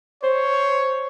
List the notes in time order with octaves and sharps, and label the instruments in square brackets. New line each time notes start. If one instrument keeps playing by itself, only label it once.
[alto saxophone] C5 [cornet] C#5